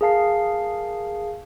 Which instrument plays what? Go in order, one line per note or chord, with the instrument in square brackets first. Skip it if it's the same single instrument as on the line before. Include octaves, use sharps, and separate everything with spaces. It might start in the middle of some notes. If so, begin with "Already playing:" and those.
[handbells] G#4 A#4 F5 A5 C7